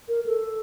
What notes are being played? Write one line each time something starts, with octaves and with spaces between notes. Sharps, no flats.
A#4
A4